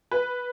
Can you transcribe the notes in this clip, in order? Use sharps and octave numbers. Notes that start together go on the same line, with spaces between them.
B4